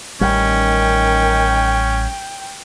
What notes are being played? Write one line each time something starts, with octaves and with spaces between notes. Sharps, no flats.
A1 D#3 G3 C#4 G5